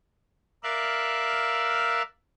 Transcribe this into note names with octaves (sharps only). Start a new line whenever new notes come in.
A#4 D5 E5 F5 E6 F#6